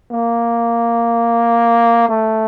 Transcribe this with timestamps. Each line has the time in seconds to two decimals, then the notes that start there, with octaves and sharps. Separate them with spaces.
0.11 A#3
2.09 A3